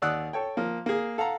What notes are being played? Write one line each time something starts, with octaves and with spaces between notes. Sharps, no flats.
D#2 D5 F#5 D#6 E6 F#6
A4 C#5 G5
F3 A#3
A#3 G#4
A4 F5 F#5 A#5